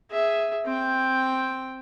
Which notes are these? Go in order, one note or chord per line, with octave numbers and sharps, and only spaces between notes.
G#4 E5
C4 G5